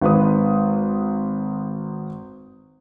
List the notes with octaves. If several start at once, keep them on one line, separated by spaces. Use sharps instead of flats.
G#1 B4 D#6